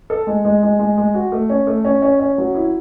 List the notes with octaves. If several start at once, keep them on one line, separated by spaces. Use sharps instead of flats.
A4
G#3
G#3
G#3
G#3
G#3
F#4
A3
C#4
A3
C#4
C#4
C#4
F#3
E4